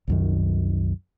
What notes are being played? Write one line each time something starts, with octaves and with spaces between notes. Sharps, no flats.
C2 F#2 D#3